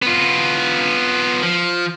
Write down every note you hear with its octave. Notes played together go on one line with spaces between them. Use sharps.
B3 F4
F3